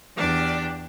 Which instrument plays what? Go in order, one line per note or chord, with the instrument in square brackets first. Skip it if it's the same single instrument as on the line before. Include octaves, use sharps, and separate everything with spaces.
[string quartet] E2 D4 G4 D5